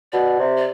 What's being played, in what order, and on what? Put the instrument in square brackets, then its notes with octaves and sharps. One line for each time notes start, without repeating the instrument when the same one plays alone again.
[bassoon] B2 [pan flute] D5
[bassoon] C3
[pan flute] D5